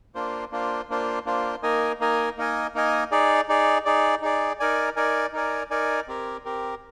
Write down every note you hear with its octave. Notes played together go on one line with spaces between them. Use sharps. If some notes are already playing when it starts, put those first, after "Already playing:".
A#3 D4 F4 C5
A#3 D4 F4 C5
A#3 D4 F4 C5
A#3 D4 F4 C5
A#3 D#4 A#4 D#5 G#5
A#3 D#4 A#4 D#5 G#5
A#3 D#4 A#4 D#5 G#5
A#3 D#4 A#4 D#5 G#5
D#4 G#4 D5
D#4 G#4 D5
D#4 G#4 D5
D#4 G#4 D5
D#4 A#4 D5 G#5
D#4 A#4 D5 G#5
D#4 A#4 D5 G#5
D#4 A#4 D5 G#5
C4 G4 A#4
C4 G4 A#4